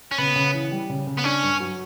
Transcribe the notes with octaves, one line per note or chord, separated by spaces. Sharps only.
C#4
C#3 B3
C#3
E3
G3
C#3
C#3
B3
C#4 D4
G2
F#3